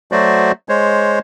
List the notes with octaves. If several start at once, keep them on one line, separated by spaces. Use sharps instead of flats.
F#3 A3 F#4 C5 D5
G#3 C5 C#5